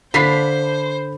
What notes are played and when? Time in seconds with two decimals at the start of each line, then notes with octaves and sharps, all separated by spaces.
0.14 D3 D4 C5 F5 B5 B6 C7